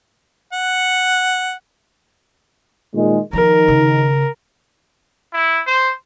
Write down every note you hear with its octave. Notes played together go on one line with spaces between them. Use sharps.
F#5
A#2 D#3 G#3
D#3 F3 A#4
C#3
E4
C5